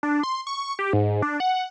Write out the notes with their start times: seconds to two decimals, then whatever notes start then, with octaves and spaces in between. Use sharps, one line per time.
0.03 D4
0.23 C6
0.47 C#6
0.79 G4
0.93 G#2
1.22 D4
1.40 F#5